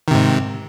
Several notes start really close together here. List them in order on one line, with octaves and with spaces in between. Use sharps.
D#3 C3 G#2